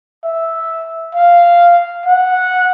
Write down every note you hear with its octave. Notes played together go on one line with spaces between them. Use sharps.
E5
F5
F#5